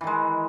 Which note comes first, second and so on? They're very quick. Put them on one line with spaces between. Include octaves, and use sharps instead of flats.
E3 D#3 G#3